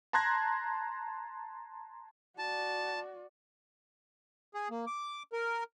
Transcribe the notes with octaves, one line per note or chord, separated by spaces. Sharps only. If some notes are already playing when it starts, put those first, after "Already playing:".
A5 A#5 C6 F#6 G#6 A#6
F#4 D5 A5
G#4
A#3
D6
A#4